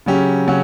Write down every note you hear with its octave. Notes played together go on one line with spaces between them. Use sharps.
C#3 F#3 C#4 G4
C#3 F#3 C#4